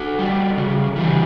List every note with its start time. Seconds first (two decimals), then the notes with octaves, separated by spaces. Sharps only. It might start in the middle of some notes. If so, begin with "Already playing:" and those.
Already playing: F#4 A4
0.19 G3
0.57 C#3
0.96 E3 G3